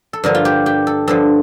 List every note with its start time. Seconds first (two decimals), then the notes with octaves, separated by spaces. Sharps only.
0.13 A4
0.24 G2 D3 F3 A#4
0.35 F4
0.45 G4
0.66 G4
0.87 A4
1.07 G2 D3 F3 A4